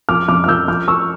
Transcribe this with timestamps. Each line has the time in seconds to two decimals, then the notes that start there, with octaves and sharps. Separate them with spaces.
0.09 F2 D6 F6
0.28 F2 D6 F6
0.44 F6
0.48 F2 E6 G6
0.68 F3 D6 F6
0.88 F3 C#6 E6